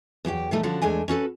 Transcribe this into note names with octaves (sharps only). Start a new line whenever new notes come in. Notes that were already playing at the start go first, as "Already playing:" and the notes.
E2 F#3 G4 G5
A#2 E3 G3 A3 D#4
D3 F3 C#4 F#4
E2 G#3 A3 D4 G#5
C#4 F#4 A4 B4